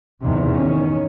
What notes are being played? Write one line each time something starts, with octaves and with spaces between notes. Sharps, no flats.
E2 G#2 C3 D#3
D#3 C#4